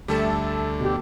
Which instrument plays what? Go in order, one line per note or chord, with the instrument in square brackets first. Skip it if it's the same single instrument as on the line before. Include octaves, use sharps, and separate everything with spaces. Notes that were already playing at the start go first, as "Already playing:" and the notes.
[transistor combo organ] D2 D3 [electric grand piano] G3 A3 A4 [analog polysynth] E5 A5
[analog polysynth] B2 G4